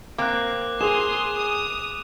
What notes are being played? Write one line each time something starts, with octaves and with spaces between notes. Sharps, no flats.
A#3 C4 D6 F#6
G#4 C6 D#6 E7 F7
D#6